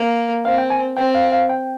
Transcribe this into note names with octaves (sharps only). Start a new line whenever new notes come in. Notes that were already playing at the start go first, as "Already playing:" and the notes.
Already playing: A#3
C4 F5
G5
G#5
C4 G5
F5
F5
G5